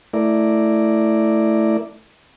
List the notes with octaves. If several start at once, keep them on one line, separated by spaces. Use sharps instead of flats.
A3 E4 A#4 D5